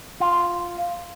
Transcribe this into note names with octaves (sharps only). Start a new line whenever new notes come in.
F4